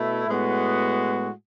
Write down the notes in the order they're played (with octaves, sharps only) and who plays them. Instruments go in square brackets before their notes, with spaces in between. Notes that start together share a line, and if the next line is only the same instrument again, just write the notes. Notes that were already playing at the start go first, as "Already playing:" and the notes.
Already playing: [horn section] B2 A3 E4
A2 G#3 B3 F#4